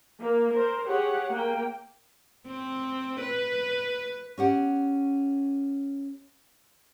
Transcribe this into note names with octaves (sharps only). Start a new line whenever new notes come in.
A#3
A#4 C5
G4 G#4 C#5 F#5
A#3 G5
C4
B4
C#4 G4 F#5